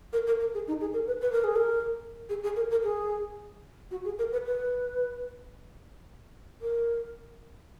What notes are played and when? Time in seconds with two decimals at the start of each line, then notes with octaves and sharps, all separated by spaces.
0.13 A#4
0.26 A#4
0.40 A#4
0.53 G#4
0.67 D#4
0.80 G#4
0.93 A#4
1.07 B4
1.21 B4
1.32 A#4
1.44 G#4
1.56 A#4
2.29 G#4
2.43 G#4
2.56 A#4
2.70 A#4
2.83 G#4
3.91 F#4
4.05 G#4
4.18 A#4
4.32 B4
4.45 B4
6.61 A#4